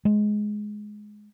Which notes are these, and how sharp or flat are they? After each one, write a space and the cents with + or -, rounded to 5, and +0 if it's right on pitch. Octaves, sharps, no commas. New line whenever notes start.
G#3 +15